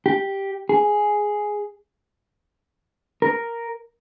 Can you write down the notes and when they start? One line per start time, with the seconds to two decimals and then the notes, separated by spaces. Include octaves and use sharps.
0.06 G4
0.69 G#4
3.22 A#4